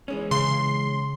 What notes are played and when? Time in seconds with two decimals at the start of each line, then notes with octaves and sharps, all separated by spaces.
0.08 E3 G#3 C#4
0.31 C#3 C6